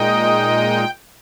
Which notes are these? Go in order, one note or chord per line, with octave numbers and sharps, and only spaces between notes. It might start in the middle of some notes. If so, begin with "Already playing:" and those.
Already playing: A#2 G#3 D#4 D#5 G5